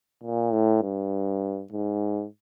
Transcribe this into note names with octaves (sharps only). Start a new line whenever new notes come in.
A#2
A2
G2
G#2